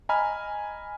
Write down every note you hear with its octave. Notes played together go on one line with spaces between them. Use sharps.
D#5 G#5 A#5 B5 F6